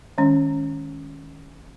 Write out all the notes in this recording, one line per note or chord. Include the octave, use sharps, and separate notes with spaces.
D#3 G#3 C#4